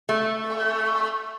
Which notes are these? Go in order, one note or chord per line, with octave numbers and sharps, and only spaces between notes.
A3